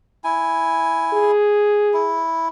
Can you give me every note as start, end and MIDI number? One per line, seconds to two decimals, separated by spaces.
0.24 1.32 64
0.24 1.32 80
1.13 2.25 68
1.94 2.48 64